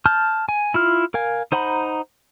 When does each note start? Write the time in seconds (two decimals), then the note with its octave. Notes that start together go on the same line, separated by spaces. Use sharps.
0.06 A5 F6 G6
0.49 G#5
0.74 E4 F4 F6
1.14 A#4 F5 G#5
1.52 D#4 C5 F#5 A#5 B5